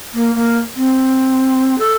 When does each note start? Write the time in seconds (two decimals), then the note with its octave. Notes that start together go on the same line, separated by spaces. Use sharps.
0.14 A#3
0.35 A#3
0.76 C4
1.79 A4